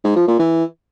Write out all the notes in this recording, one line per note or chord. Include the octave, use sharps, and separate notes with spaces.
G#2
F3
A#2
E3